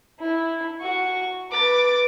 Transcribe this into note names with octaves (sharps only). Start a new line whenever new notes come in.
E4
F#4 C#6
B4 D6 A6